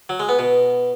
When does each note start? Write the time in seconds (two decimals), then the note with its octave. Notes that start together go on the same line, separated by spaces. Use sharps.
0.09 F#3
0.20 G#3
0.29 B3
0.39 B2